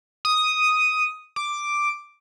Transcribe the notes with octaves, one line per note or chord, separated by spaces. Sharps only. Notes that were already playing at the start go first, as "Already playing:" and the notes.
D#6
D6